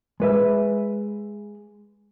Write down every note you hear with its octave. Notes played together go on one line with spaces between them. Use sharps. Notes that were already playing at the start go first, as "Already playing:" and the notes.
G#3 B4 E5